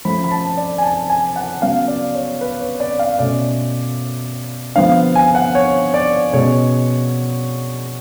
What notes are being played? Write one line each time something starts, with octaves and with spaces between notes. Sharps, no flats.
F3 A3 C#4 B5
B5
A5
D5
G#5
A5
G#5
F#5
C#3 F#3 B3 F5
D5
C#5
B4
C#5
D5
F5
B2 A3 C#4 D5
D3 F3 B3 F5
G#5
F#5
C#5
D5
B2 G#3 C#4 C#5